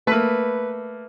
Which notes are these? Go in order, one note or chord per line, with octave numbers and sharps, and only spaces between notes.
A3 A#3 B4